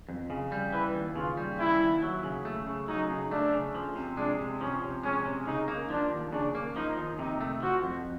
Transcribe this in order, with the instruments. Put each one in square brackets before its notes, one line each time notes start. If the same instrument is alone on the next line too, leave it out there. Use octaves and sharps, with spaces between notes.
[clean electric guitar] F2
C#3
G3
[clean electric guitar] E3 [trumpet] B4
[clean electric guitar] D#2
[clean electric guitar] C#3 [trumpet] F4
[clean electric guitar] G3
[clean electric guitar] E3 [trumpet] E4
[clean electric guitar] D#2
F#3
C#3
A3
C#3
[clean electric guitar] F#3 [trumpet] D#4
[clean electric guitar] C#3
[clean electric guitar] A3 [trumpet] D4
[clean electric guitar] C#3
F3
C3
[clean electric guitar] G#3 [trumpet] D4
[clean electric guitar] C3
[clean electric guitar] F3 [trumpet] C#4
[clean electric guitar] C3
[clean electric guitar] G#3 [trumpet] C#4
[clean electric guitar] C3
[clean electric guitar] C#3 [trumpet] D#4
[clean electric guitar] A#3
[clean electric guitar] F3 [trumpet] D4
[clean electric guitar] D#2
[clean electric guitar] C#3 [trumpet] D4
[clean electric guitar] A#3
[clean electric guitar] F3 [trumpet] D#4
[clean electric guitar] D#2
[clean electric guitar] C3 [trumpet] D#4
[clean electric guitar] A3
[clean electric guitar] F3 [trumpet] F#4
[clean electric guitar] F2